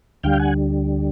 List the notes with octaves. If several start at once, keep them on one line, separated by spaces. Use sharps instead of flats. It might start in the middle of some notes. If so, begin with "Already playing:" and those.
D2 D3 G3 F5 G5
F#5 G#5